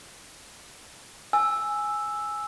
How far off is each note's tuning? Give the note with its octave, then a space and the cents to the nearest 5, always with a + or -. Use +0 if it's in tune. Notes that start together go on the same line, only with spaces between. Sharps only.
G#5 +0 E6 +0